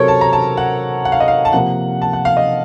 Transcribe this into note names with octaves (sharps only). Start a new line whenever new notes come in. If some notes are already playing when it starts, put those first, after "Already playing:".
Already playing: C3 F#3 C4 A4 A#4 C#5
A5
A#5
A5
F#5
F#5
F5
D#5
F5
A5
C3 F3 A#3 F#5
A5
F#5
F5
D#5